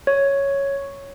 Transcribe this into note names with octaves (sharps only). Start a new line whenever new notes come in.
C#5